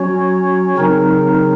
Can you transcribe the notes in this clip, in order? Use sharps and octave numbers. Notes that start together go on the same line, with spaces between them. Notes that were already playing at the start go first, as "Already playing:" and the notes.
Already playing: F#3 C#4 F#4 C#5
C#3 F#3 C4 D#4 A#4